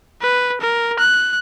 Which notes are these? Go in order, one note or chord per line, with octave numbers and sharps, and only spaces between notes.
B4
A#4
F#6